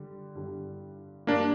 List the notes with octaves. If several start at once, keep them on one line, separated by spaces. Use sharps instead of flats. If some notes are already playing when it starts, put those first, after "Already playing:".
Already playing: D3 G3
G2 D3 G3
G2 D3 G3 A#3 D4